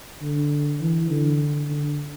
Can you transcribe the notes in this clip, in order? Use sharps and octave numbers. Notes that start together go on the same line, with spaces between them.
D3
E3
D3
D3